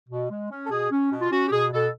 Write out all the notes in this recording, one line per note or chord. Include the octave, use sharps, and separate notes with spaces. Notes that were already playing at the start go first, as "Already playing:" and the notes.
B2
G#3
C#4
A4
B2 G#4
C#4
B2
F4
C#4 F#4
G4
B2 G#4
B2 A4